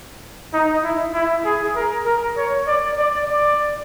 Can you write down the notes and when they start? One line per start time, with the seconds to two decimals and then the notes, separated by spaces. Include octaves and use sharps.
0.53 D#4
0.83 E4
1.14 E4
1.45 G#4
1.76 A#4
2.06 A#4
2.37 C#5
2.67 D5
2.98 D5
3.29 D5